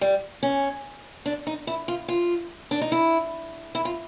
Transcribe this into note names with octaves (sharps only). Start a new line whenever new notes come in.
G3
C#4
D4
D#4
E4
F4
F4
D4
D#4
E4
E4
F4